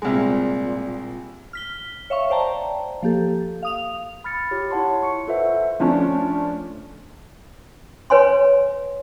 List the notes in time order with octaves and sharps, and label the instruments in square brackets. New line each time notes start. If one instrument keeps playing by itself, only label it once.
[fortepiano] C2 G#3 [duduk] A#2
[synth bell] F6 B6 G7
C#5 E5 F5 C#6
C5 D5 G5 A5 A#5
F3 A#3 G4 A4
F5 D#6 F7
[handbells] B5 F6 A6 C#7
F4 G4 C#5
E4 C#5 F#5 A5 C6
C#6 C#7
F4 A4 B4 C5 E5 F#5
[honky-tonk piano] F3 A3 C#4 D4
[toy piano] B4 C#5 G#5 C6